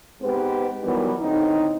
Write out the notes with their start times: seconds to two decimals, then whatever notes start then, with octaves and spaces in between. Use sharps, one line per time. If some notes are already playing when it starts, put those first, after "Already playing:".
0.21 G#2 G#3 B3 C4 G4 B4
0.83 D#3 E3 F#3 G3 B3
1.20 A2 D3 C4 D#4